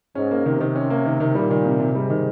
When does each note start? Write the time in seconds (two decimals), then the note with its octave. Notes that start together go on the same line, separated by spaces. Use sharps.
0.15 G#2 C#4
0.31 A#3
0.46 C3 D#3
0.61 D#3
0.75 C#4
0.90 A#3
1.06 D#3
1.20 D#3
1.35 A#2 G3
1.51 D#3
1.66 C3
1.80 C3
1.95 G#2 G3
2.10 D#3